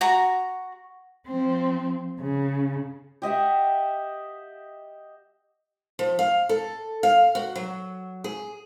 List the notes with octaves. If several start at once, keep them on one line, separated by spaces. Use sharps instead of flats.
F#4 A#5
F3 C4
C#3
G4 D#5 E5 F#5
F3
F5
A4
F5
F#4
F#3
G#4